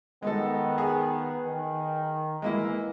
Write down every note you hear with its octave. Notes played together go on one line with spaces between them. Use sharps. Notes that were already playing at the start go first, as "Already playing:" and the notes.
D#3 G#3 B3 D#4 A4
G#4
D#3
E2 E3 G#3 A#3 E4